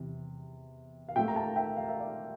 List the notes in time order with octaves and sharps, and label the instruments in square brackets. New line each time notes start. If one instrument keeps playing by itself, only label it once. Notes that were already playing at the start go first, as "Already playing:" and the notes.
Already playing: [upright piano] E2 C3 E3
F5
A#2 A3 E5 G5
A#5
F5 A5
E5 G5
F5
E5
D5 F5